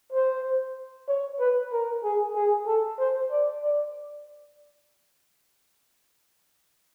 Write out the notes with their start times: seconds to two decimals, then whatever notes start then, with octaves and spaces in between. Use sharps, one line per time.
0.12 C5
1.09 C#5
1.39 B4
1.72 A#4
2.04 G#4
2.35 G#4
2.67 A4
2.99 C5
3.31 D5
3.63 D5